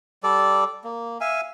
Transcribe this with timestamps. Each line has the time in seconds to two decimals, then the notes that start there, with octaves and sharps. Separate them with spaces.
0.23 G3 A4 D5
0.84 A#3
1.21 E5 F5 G#5